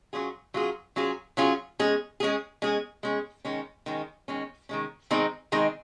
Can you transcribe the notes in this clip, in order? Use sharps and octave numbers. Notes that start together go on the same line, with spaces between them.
F#3 C#4 F4 G#4
F#3 C#4 F4 G#4
F#3 C#4 F4 G#4
F#3 C#4 F4 G#4
G#3 C#4 G#4
G#3 C#4 G#4
G#3 C#4 G#4
G#3 C#4 G#4
D#3 G#3 C#4
D#3 G#3 C#4
D#3 G#3 C#4
D#3 G#3 C#4
D#3 G#3 C4 D#4 G#4
D#3 G#3 C4 D#4 G#4